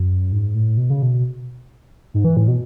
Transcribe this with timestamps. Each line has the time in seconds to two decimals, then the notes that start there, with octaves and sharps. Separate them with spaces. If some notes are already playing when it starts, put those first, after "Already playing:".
Already playing: F#2
0.32 G#2
0.54 A2
0.77 B2
0.90 C#3
1.02 B2
2.14 G#2
2.25 E3
2.37 A2
2.48 B2